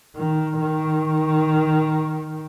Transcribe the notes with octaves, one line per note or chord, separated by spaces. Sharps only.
D#3
D#3